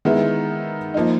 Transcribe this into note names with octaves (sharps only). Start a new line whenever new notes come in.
D#3 G#3 B3 E4
F3 A#3 D#4